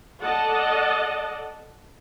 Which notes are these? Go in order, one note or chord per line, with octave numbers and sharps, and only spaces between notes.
A4 D5 D#5 F#5 A5